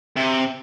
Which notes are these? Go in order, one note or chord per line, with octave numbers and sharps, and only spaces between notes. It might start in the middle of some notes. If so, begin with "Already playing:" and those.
C3